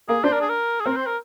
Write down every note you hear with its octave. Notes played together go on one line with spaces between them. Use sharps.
A#3 G#4
D4 C5
A#4
G#4
A#4
G#4
C4 A#4
C5
A#4